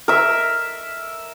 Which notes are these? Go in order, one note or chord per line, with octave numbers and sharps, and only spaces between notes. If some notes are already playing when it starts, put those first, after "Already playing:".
A#4 E5